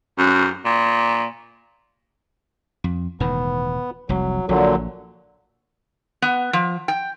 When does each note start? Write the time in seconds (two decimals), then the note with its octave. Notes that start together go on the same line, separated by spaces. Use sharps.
0.18 F#2
0.65 A#2
2.84 F2
3.20 E1 A2 D#3 B3
4.09 F1 C2 F#3
4.49 A#1 A#2 D3 F#3
6.22 B3
6.53 F3
6.88 G5